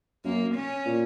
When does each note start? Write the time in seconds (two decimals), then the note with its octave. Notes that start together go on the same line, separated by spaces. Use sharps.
0.25 F#2 A#3
0.55 C#4
0.86 A#2